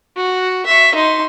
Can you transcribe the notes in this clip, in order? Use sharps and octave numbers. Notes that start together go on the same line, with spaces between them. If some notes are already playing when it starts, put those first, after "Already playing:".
F#4
E5 C#6
D#4 C6